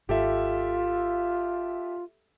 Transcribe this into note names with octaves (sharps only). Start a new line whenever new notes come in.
G#1 F4 G4 A4 E5